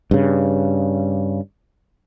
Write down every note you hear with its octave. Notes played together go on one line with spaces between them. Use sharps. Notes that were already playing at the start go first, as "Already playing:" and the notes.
G2 C#3